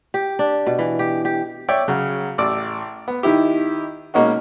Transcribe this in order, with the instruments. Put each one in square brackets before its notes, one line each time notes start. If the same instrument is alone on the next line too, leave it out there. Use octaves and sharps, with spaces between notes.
[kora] G4
D4
B2
E3
G4
G4
[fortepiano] C#5 D5 E5 G5 D6
C#3 F#3
A1 D5 E6
B3
D#3 D#4 E4 G4
B2 G#3 A#3 C#4 D#4 F#4